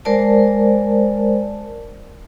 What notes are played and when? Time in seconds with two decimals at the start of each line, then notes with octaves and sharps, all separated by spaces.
0.05 G#3 A#4 C5 D5 A5